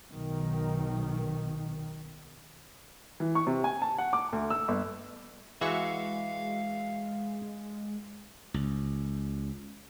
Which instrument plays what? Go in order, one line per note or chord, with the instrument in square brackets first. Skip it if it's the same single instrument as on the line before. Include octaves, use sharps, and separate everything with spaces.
[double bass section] B1 D#3
[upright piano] E3
C#6
C3
G#5
A5
F#5
D6
D2
E6
G1
[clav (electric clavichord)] E3 [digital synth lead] G#3 [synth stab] F#4 E5 C#6 [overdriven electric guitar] F5
[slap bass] C#2